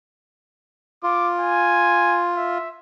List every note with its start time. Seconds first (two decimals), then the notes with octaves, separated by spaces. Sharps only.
1.03 F4 D6
1.40 G#5
2.36 E5